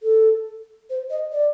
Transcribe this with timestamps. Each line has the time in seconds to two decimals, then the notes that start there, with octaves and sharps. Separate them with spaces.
0.03 A4
0.90 C5
1.10 D#5
1.32 D5